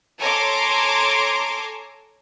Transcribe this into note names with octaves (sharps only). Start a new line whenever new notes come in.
A4 C#5 G#5 A#5 C6 D6